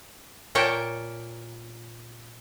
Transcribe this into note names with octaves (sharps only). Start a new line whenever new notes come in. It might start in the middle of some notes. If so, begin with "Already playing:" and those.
A#2 A#4 C#5 G5 A5